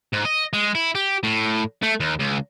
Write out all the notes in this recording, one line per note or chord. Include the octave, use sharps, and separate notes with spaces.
G#2
D#5
G#3
E4
G4
A2
A3
D#2
C#2